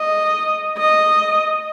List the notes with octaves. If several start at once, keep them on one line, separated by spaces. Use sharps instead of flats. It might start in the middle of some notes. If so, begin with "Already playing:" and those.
Already playing: D#5
D#5